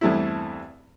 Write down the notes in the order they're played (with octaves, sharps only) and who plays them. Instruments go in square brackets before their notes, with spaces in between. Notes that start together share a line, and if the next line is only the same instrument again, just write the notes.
[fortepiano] E2 G2 A3 C4 E4